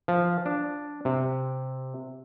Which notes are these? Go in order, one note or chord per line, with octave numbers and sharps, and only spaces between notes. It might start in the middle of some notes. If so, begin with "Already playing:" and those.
F3
D4
C3